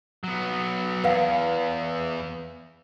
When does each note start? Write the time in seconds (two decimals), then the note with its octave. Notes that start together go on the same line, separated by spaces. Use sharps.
0.24 F#3 B3
1.04 E2 B4 F5 F#5